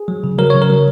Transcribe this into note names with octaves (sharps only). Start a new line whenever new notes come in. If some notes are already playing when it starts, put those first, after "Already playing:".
Already playing: G#4
F#3
C#3
F#3 A#4
C#3 C#5
A#4
F#3